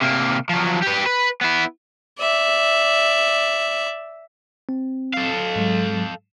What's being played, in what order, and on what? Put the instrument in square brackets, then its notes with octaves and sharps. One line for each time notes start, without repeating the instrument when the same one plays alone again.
[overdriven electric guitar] C3 A#3
F3 F#3
G4 B4
B4
B3 E4
[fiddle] D5 E5
[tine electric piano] C4
[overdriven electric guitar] A4 F5
[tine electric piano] G#2 F#3 G#3